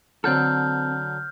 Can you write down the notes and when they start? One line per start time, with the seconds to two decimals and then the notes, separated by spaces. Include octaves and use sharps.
0.24 D3 F#3 C4 A4 F6 G6